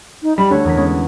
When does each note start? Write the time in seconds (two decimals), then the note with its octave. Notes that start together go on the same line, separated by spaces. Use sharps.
0.23 D#4
0.38 G3 B5
0.50 D3 A3 F#4 C#5
0.65 E2 A#4 B6
0.77 G#3 B3 C#4